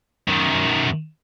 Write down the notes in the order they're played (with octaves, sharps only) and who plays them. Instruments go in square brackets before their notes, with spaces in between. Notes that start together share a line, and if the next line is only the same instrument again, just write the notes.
[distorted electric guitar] F#2 D#3